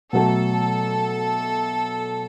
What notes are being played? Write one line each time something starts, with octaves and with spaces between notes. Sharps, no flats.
B2 F#3 A3 A4